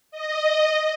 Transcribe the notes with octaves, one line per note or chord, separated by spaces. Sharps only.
D#5